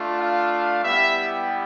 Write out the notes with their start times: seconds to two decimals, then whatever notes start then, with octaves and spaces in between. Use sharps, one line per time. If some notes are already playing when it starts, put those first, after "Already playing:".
Already playing: A3 D4 F4
0.17 F5
0.83 G3 B3 E4 G4 E5